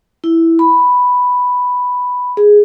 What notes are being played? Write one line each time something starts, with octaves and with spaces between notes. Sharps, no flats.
E4
B5
G#4